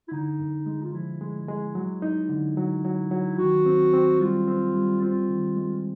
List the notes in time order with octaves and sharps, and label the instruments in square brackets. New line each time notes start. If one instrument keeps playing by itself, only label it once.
[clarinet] E4
[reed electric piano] D3 [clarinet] D#4
[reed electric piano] F#2
G#3
[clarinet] F4
[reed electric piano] F3 [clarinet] E4
[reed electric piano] G#3
G#3
F#3
D#4
D3
F#3
F#3
F#3
[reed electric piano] D#3 [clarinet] F#4
[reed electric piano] C4
C4
[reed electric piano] G3 [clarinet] F4
[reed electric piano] C4
G3
[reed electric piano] C4 [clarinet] F4
[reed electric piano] D#3
G#3